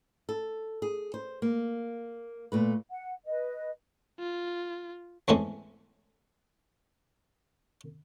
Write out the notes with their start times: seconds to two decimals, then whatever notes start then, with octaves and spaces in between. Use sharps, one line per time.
0.29 A4
0.82 G#4
1.14 C5
1.42 A#3
2.52 A#2 A3 B4
2.91 F#5
3.26 B4 D#5
4.19 F4
5.28 E2 G#2 A3 C4 C#4